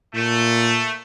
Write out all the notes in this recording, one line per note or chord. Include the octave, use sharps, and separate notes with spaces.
A#2 A3